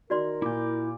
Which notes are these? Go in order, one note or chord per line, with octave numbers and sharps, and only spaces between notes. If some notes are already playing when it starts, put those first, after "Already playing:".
D#3 F#4 A#4 D5 C6
A#2 E4 D6 G6